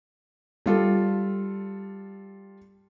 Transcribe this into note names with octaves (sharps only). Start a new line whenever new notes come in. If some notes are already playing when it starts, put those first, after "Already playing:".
G3 F4 A4